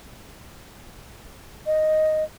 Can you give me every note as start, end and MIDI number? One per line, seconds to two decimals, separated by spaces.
1.66 2.24 75